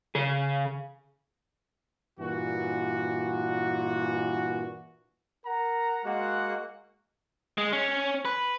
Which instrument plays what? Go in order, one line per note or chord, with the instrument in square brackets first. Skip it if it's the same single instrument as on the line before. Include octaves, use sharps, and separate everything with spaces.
[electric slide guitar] C#3 G#4
[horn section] G2 A#2 E3 F#4
A#4 F#5 A#5
G#3 A#3 F#4 F#5
[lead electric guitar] G#3
C#4
B4